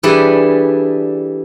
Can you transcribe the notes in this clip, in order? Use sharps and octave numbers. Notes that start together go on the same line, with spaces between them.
E3 G3 D4 G#4 A4 B4